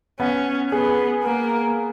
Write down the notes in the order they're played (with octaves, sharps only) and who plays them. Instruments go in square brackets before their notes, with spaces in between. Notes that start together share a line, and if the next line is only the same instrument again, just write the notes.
[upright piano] B3 [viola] C#4
[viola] B3 [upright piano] G#4
[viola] A#3